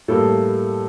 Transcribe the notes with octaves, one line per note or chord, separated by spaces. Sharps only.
A2 G3 A#3 A4